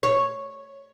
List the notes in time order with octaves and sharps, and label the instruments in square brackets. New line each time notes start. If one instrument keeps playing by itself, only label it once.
[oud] C#5